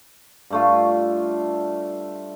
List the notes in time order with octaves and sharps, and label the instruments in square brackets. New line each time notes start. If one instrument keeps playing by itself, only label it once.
[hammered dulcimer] G2 A3 F4